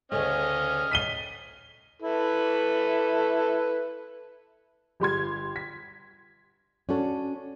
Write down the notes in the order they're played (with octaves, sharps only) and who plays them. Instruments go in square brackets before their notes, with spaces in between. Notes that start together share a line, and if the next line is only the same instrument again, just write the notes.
[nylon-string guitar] D2 C#3 A3 [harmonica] C#4 D#5 F6
[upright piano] B6 D#7 G7
[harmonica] E4 A4 B4
[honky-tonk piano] G1 G4 C6 G#6
B6
[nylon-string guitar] C#4 D4 F#4 A4 C#5